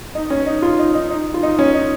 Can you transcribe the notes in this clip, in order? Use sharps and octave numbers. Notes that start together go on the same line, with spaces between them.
D#4
C#4
D#4
F4
D#4
D#4
D#4
F4
D#4
C#4
D#4